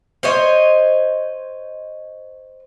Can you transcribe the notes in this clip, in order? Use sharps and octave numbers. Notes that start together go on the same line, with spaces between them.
C5 C#5 D#5